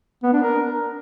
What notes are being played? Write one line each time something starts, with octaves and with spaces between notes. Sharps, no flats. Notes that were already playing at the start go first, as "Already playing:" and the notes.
B3
D4
A#4